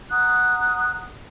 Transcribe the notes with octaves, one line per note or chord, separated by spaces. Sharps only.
F#5 A#5 D#6 F#6